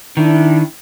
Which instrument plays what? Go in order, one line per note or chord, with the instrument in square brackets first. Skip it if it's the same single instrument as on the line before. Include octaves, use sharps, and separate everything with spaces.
[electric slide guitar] D#3 [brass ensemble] D4 E4